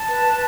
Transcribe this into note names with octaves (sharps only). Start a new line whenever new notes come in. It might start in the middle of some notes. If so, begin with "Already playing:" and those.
Already playing: A5
B4
B4